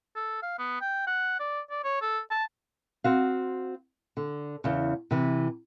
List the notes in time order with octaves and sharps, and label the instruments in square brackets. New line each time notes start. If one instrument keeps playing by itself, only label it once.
[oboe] A4
F5
B3
G5
F#5
D5
D5
C#5
A4
A5
[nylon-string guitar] C4 F#4 F5
D3
E2 C#3
C3 E3